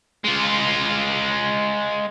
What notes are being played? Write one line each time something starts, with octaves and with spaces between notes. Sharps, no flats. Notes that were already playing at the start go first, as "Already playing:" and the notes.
G#3 F4